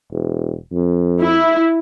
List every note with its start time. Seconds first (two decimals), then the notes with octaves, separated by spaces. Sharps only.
0.12 E1
0.72 F2
1.21 E4